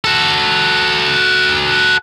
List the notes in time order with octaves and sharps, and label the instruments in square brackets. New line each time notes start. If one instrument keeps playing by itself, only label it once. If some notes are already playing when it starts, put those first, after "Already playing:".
[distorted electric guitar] F#4 A4